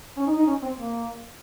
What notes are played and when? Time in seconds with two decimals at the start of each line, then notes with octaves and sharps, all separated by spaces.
0.17 C#4
0.26 D#4
0.37 D#4
0.46 C#4
0.62 C4
0.76 A#3